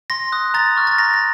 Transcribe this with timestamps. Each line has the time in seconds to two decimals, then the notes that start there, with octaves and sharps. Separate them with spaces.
0.10 C6 A#6
0.32 D#6 F#6
0.54 A#5 A6
0.76 C#6 F6
0.87 A6
0.99 A#5 A#6
1.14 A#6